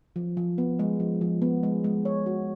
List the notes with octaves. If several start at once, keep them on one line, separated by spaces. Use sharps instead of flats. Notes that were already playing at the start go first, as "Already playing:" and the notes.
F3
F3
B3
G#3
F3
F3
B3
G#3
G#3
C#5
F#4